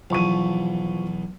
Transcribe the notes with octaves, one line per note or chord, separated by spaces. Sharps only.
B1 E2 F3 C#6 D#7